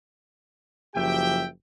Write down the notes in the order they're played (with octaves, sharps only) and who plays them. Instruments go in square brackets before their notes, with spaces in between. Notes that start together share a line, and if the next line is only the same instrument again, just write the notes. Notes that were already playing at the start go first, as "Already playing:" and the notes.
[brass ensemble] F#1 F3 G4 E5 G5